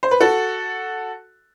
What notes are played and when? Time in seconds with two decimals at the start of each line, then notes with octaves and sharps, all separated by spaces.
0.03 C5
0.11 B4
0.20 F#4 A4